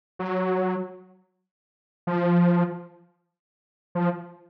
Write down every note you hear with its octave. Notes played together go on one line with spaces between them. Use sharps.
F#3
F3
F3